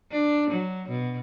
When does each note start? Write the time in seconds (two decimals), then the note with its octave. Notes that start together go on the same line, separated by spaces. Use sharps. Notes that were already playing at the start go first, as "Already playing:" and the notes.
0.12 D4
0.50 F#3
0.89 B2